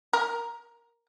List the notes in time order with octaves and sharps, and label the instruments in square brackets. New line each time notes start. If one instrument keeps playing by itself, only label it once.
[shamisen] A#4